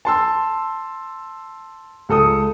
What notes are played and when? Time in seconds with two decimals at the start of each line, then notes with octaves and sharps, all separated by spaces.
0.05 A5 C6 E6
2.09 C#2 A4 D#6